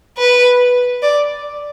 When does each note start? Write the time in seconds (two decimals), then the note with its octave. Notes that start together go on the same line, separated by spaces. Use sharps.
0.18 B4
1.02 D5